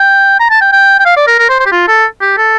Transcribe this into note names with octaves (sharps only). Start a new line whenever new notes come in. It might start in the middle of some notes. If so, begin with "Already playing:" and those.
Already playing: G5
A#5
A5
G5
G5
G5
F5
D5
A#4
A#4
C5
C5
G4
F4
A4
G4
A4